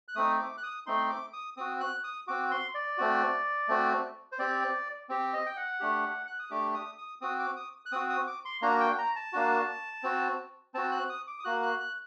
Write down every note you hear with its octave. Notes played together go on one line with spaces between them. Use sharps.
F#6
A3 C4 D#4 D#6
D6
F#6
D#6
A3 C4 D#4 C6
D6
D#6
C4 F#4 D#6
F#6
D#6
C4 F#4 D6
C6
D5
A3 C4 F#4
A3 C4 F#4
C5
C4 G4 D5
C4 G4
D#5
G5
F#5
A3 D4 G4
F#6
D#6
A3 D4 G4 D6
D#6
D#6
C4 F#4 D#6
D6
D#6
F#6
C4 F#4 D#6
D#6
D6
C6
A#3 D4 F#4 A#5
G5
A#5
A5
A#3 D4 F#4
C4 F#4
C4 F#4 A5
F#6
D#6
D6
D#6
A#3 F#4 F#6
F#6
F#6